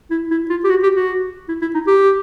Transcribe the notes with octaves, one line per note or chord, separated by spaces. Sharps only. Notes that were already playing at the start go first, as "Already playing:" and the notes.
E4
E4
F4
G4
F#4
G4
F#4
E4
E4
D#4
G4